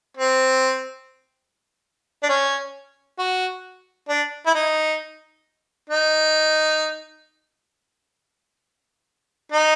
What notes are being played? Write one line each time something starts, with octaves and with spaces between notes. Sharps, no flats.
C4
D4
C#4
F#4
D4
E4
D#4
D#4
D#4